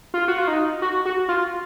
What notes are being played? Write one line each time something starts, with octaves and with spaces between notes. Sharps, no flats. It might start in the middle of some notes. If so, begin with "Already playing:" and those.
F4
F#4
F4
D#4
F#4
F#4
F4